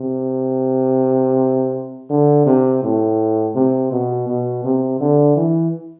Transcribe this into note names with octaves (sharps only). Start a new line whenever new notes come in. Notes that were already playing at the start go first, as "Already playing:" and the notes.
Already playing: C3
D3
C3
A2
C3
B2
B2
C3
D3
E3